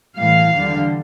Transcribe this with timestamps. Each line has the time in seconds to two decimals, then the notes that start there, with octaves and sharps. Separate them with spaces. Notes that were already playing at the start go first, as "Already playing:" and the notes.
0.17 A2 E3 G3 F5
0.53 E2 D3 G3